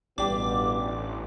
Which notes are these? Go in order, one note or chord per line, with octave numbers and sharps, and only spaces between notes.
A1 G2 B2 B3 D4 G4 D6